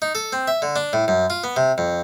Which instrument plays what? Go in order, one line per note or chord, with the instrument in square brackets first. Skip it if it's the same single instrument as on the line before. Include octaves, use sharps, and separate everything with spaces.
[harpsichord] D#4
A4
C4
E5
D3
D4
A2
F#2
F4
B3
C3
F2